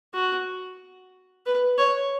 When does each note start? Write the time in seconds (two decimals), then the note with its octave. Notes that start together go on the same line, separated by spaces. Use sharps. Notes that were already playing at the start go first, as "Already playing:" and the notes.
0.14 F#4
1.46 B4
1.78 C#5